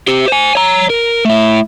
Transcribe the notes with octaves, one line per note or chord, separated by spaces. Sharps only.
G4 C5
C5 G#5
C#5 A#5
A#4
A3 E4